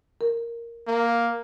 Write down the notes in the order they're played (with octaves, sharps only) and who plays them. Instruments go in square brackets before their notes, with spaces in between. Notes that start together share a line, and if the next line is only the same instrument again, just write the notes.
[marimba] A#4
[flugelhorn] A#3